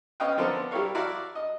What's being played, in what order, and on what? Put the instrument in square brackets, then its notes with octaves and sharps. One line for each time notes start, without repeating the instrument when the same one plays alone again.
[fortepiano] B3 C#4 C#5 D#5 F5 G5
D3 F3 B3 C4 A4 A#4
G3 E4 G4 A#4 C#5 F5
E4 F#4 D5 F5 A5 A#5
D#5